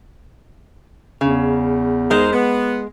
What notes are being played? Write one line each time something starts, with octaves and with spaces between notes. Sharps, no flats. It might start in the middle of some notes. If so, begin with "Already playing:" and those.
E2 C#3
G#3 D#4 A#4 C5
B3